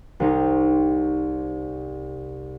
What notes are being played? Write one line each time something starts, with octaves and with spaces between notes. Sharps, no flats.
C2 C3 C4 D#4 C#6